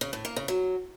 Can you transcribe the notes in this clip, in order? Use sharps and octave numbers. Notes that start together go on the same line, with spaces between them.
C#3
A2
A#3
C#3
F#3